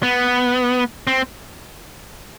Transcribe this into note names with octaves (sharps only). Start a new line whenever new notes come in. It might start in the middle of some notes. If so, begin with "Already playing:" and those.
B3
C4